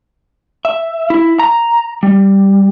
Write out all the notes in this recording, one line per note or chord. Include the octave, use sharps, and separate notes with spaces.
E5
E4
A#5
G3